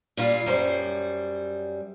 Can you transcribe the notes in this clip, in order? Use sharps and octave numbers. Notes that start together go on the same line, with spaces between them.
A#2 G3 F4
F#2 G3 C5